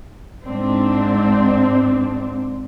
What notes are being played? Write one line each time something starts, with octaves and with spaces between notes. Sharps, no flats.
G#2 C4 D4